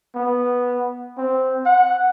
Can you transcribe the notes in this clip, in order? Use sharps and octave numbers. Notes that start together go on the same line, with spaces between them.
B3
C4
F#5